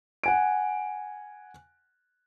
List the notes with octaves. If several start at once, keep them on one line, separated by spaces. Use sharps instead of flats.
F#5 G#5 D7